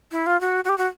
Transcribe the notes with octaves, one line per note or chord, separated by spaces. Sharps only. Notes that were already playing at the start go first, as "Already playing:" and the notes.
E4
F4
F#4
F#4
G4
F#4